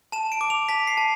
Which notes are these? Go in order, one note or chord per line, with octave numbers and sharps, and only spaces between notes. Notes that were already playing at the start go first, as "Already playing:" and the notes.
A5 E7
D7
D6
F7
A5 B6
C7
A5